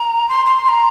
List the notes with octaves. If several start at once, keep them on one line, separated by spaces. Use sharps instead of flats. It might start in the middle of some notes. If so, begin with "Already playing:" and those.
Already playing: A#5
C6
C6
C6
A#5